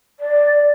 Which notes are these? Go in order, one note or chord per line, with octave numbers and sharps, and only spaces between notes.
D5